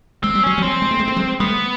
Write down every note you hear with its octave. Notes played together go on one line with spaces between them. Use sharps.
G#3 C4
G3
F#3 C#4
F3 G3
C4
G#3
A3
G#3
A3
F#3 G#3
G3 A3 B3